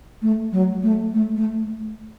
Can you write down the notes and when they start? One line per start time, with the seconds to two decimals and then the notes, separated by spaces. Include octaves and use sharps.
0.22 A3
0.52 F#3
0.83 A3
1.14 A3
1.36 A3